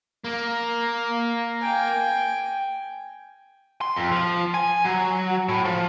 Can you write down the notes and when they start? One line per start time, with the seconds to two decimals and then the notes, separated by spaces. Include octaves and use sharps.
0.25 A#3
1.62 G5 G#5
3.81 C6
3.96 F2
4.12 F3
4.54 G#5
4.84 F#3
5.49 A2
5.65 F3